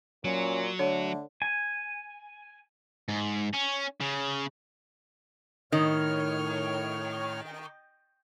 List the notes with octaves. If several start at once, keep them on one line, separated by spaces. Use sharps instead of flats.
A#2 F#3 C#4
D3 A3 C#5
G#5
G#2
C#4
C#3
A2 D#3 C#5 F6